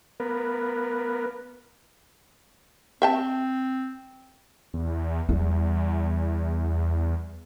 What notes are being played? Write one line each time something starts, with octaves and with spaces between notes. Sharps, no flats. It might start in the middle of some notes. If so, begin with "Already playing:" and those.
B3 A#4 B4
C4 E5 G5 A5
E2
E2 G3